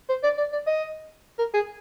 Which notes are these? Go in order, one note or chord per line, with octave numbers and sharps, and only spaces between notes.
C5
D5
D5
D5
D#5
A#4
G#4